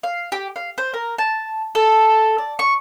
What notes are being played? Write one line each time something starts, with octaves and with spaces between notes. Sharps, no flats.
F5
G4
F5
C5
A#4
A5
A4
D5
C#6